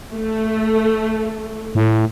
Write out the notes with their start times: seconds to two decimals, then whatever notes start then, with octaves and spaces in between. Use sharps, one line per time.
0.13 A3
1.75 A2